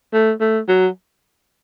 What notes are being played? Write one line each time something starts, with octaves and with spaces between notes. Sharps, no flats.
A3
A3
F#3